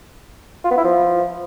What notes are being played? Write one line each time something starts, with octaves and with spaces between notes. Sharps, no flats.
F4
B3
E4
F3